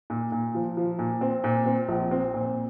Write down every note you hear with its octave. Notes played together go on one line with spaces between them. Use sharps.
A#2
A#2
F3
F3
A#2
C4
A#2
C4
A#1
C4
A#2